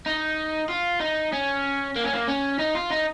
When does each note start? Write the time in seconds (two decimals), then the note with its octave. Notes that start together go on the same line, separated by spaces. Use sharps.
0.06 D#4
0.69 F4
1.00 D#4
1.33 C#4
1.96 A#3
2.04 C#4
2.13 A#3
2.28 C#4
2.59 D#4
2.75 F4
2.90 D#4